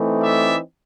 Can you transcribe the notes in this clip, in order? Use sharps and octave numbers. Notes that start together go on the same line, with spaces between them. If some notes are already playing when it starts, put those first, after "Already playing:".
Already playing: E3 A3 C4 D#4
D5 E5